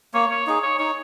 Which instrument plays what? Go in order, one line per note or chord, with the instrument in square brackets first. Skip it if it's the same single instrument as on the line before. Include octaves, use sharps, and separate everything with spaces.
[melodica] A#3 [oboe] C#5
[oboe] C#5
[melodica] D#4 G#4
[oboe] C#5
[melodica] D#4 [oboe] C#5